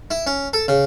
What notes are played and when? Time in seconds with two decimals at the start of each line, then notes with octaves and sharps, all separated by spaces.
0.11 E4
0.27 C#4
0.53 A4
0.68 C#3